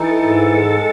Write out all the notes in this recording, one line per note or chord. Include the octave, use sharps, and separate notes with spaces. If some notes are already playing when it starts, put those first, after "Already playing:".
Already playing: E3 D#4 A4
G#2
G#3